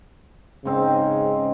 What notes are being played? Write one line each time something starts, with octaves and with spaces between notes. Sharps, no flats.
G#2 C#3 C4 D#4